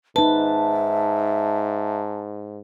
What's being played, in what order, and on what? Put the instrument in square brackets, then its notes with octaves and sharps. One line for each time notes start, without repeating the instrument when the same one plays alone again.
[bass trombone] G#2 [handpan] D#4 B4 [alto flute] E5 [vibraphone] A5